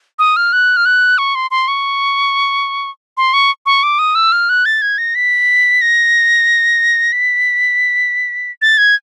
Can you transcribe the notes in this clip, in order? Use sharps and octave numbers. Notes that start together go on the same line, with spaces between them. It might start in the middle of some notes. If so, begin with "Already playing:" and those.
D#6
F6
F#6
F6
F#6
C#6
C6
C6
C#6
C6
C#6
C#6
D6
D#6
E6
F6
F#6
A6
G#6
A#6
B6
A#6
B6
A6
G#6